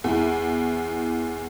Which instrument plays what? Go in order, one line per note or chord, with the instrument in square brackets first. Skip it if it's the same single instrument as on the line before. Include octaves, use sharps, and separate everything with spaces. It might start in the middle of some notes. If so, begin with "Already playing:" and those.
[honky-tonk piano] E2 E4